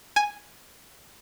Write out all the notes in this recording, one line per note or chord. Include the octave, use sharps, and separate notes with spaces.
G#5